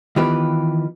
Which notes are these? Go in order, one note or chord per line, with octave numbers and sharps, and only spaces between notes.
D#3 E3 B3 F4 G4 B4